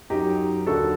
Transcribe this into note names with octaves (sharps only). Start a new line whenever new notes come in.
F#2 F#3 D#4 G4
D#2 D3 F#3 F#4 A4